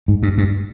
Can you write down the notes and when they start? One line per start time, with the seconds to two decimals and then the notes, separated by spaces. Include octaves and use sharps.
0.08 G#2
0.23 G2
0.38 G2